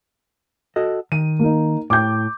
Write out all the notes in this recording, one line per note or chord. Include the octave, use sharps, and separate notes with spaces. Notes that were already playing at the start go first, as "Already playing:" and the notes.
F#4 A4 D#5
D#3 D#7
A#3 D#4
A2 G5 D6 G6